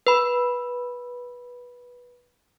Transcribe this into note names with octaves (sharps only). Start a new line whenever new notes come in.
B4 B5